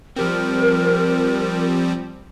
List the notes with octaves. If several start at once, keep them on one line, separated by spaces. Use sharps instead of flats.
F3 G3 C4 A#4